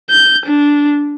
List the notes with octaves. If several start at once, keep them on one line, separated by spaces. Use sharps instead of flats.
G6
D4